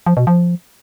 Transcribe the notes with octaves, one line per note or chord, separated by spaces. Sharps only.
F3
B2
F3